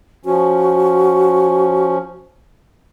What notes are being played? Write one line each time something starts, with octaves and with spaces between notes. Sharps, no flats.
F3 C#4 F#4